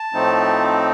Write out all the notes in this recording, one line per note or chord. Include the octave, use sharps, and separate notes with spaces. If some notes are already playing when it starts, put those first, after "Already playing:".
Already playing: A5
A2 F3 A3 C4 D#4